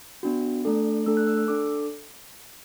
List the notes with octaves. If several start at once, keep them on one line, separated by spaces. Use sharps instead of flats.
B3 D4 F#4
A3 D4 A4
A3 D4 A4 E6
F#6
E6
E6
D4 A4 D6